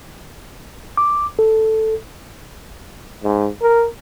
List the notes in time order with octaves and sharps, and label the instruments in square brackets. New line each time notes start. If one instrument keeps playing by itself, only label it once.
[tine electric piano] D6
A4
[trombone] G#2
A#4